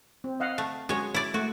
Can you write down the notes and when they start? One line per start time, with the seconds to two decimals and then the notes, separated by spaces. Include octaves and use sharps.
0.24 C4
0.40 D#5 F5 F#5
0.58 A3
0.89 G#3 C#4 F#4 G#4 C#5
1.14 E4 D5
1.34 A3 F#4